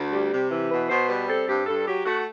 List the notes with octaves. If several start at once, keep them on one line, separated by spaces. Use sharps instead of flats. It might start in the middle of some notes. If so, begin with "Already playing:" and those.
Already playing: D2
G3
C3
E3
B2 B4
B2 C5
G3 B4
C4 A4
G2 G4
G2 A4
F#3 G4
A3 F#4